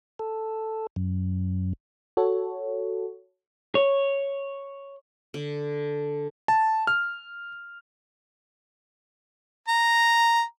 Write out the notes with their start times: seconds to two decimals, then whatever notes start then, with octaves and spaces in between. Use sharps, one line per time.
0.19 A4
0.96 F#2
2.17 F#4 A4 C#5
3.75 C#5
5.34 D3
6.48 A5
6.87 F6
9.68 A#5